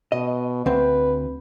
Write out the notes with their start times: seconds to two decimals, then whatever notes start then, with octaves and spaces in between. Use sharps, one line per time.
0.12 B2 D#5
0.66 D2 C4 B4